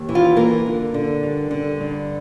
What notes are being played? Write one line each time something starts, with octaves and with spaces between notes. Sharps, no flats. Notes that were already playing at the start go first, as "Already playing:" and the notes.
Already playing: D#2
E3
F4
A#3 A#4
D3
D3
G2
D3
G2